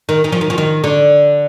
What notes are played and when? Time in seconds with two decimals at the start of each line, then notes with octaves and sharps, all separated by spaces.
0.09 D#3
0.24 D#3
0.32 F3
0.41 D#3
0.50 F3
0.58 D#3
0.84 D3